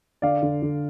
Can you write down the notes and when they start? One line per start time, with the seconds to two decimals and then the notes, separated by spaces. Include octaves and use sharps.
0.22 D3 D5 F5
0.42 D3
0.62 D3